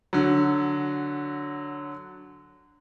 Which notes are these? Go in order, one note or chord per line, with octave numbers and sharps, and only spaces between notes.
D3 F#3